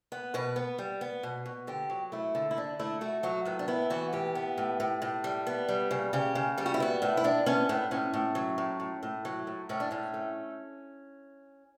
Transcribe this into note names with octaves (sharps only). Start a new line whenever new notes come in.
B3
B2 B4
B3
G3
B3
B2
B2
D3 G4
F#3
A3 E4
D3
E4
D3 D4
A3 E4
A3 F#4
F#3 F#4
A2 B3
D4
B3 E4
E3 F#4
A2 G4
B3
A2
A2
A2
G3
B3
G3
C#3
C#3 G4
C#3
G3 G4
F#4
E4
B3 F#4
A2 E4
E4
A2 D4
B3 C#4
A2 B3
A2 C#4
A2
F#3
A2
A2
A2
F#3
A2
A2 C#4
D4
A2 C#4
A3